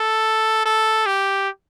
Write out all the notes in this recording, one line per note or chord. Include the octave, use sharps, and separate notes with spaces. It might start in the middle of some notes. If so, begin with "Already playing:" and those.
Already playing: A4
A4
G4